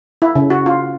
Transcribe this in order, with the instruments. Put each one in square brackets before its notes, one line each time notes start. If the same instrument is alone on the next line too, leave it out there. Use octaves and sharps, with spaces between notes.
[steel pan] E4
C#3
F#4
F4